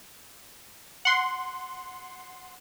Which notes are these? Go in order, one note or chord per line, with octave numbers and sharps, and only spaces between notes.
F#5 C6